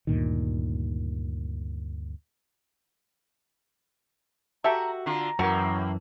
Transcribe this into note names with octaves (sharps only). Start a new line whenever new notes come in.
D2 G2 A#2 D#3
F#4 G4 A4 E5 A#5
D3 D4 F4 A#5
F#2 A2 E3 A#3 F#4 A#4